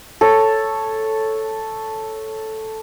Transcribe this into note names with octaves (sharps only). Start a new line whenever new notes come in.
A4 C#5